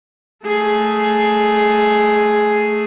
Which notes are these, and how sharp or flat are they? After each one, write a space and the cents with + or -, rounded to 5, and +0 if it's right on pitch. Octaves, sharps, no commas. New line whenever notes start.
A3 +5 G#4 +10